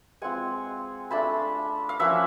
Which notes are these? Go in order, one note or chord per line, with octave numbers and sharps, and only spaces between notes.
G#3 C4 F4 F#5 G#5
A3 D4 F4 A5 B5
F5
F3 A#3 C#4 E5 F#5